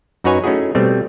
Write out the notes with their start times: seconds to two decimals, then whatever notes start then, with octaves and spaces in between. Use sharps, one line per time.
0.24 F#2 D#4 F#4 B4 C#5 G#5
0.44 A3 C#4 D#4 E4 F#4 G#4
0.75 B2 G3 A3 C4